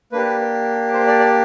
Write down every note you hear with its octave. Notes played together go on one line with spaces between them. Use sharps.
A#3 D4 G4 B4
C5
D5
D5